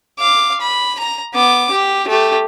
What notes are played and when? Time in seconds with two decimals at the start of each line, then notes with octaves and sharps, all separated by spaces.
0.19 F5 D6
0.61 B5
0.99 A#5
1.34 B3 D6
1.71 G4
2.08 A3 G4